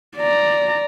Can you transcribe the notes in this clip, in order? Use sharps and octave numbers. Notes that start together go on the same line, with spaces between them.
D5 A#5